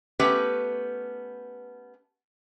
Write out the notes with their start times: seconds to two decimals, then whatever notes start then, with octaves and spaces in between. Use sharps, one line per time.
0.20 A3 B3 C#4 G4 B4